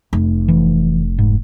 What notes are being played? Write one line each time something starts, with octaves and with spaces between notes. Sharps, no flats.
F1
E3
G#2